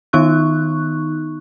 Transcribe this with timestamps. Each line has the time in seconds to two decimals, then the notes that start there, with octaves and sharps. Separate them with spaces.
0.13 D#3 B3 D#4 C#6 F#6